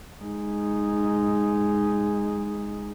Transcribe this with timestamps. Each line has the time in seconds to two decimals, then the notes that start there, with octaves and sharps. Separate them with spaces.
0.23 G#3 D#4